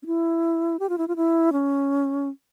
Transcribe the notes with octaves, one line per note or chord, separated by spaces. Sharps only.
C#4
E4
G4
F4
E4
F4
E4
C#4